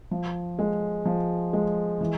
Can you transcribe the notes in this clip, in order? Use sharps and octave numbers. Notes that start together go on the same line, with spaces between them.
F3
G#3
F3
G#3
E3